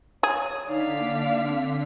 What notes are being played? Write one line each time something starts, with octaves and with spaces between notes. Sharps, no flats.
G#4 C#5
D3 D#4 D5 F5 B6
A#3
C4